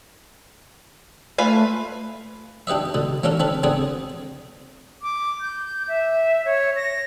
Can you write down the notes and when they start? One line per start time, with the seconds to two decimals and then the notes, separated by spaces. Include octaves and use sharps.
1.38 A3 F4 B4 G#5
2.67 D4 G4 B4 D#5 E5
2.94 B2 D3
3.23 A#3 C#4 D4 A4 A#4
3.40 C4 D4 A4 B4
3.63 D3 B3 C4 D4 G#4
5.02 D6
5.41 G6
5.88 E5
6.45 C#5
6.76 A#6